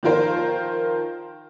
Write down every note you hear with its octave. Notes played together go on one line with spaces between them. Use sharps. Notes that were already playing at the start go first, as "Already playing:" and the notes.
D#3 F3 F4 A#4 C5